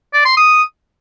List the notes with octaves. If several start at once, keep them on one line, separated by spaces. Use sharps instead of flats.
D5
C6
D#6